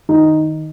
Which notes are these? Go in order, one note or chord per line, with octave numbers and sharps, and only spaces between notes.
D#3 D#4